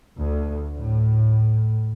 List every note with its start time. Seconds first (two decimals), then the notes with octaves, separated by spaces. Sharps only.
0.17 D2
0.77 A2